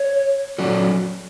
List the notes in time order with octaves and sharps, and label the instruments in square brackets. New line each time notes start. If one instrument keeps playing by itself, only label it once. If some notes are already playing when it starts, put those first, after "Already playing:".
Already playing: [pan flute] C#5
[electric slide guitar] F#3 C#4 F#4 A4 D5